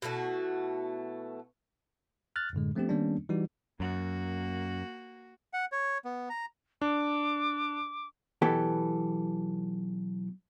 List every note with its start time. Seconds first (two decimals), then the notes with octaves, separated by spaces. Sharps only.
0.02 B2 E3 A3 F#4
2.36 F6 F#6 A6
2.53 F#2 A2 D3 G#3
2.75 F3 A3 B3 C4 D4 G4
2.89 D#3 G3 A#3 B3 C#4 D4
3.29 E3 G3 D#4 F#4
3.80 F#2 A#3 F#4
5.53 F#5
5.72 C#5
6.05 B3
6.30 A#5
6.82 D4 D6
8.42 B1 E3 B3 G4 A4